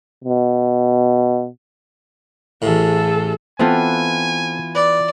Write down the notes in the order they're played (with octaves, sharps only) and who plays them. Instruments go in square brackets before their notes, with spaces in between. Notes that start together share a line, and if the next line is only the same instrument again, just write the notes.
[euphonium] B2
[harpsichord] A1 A2 [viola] G#4 A4
[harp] E3 B3 F4 [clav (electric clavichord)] C4 A4 G5 [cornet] G#5
[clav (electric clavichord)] B4 [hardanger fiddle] D5